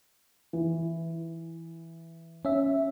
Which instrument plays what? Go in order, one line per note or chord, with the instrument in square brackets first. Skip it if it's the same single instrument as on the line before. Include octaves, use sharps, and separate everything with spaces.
[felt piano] E3
[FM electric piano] C#4 E5